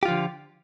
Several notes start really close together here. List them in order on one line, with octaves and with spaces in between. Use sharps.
G4 F4 F3 D3